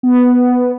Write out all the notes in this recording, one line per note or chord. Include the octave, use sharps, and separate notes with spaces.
B3